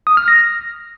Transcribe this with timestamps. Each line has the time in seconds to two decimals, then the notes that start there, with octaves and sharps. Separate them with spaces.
0.07 D#6
0.17 F6
0.28 A#6